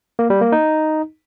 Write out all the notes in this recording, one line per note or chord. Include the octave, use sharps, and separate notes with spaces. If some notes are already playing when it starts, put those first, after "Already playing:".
A#3
G3
A#3
D#4